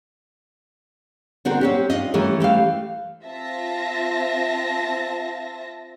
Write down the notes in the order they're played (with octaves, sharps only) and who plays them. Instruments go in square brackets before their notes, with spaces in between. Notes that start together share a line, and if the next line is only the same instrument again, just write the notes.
[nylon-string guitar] D3 C4 D4 F#4 A#4
C4 C#4 G4
D4 F4 D#5
E3 A3 C#4 G4 A#4
E3 A3 G4 F5
[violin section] C4 F4 E5 A5 A#6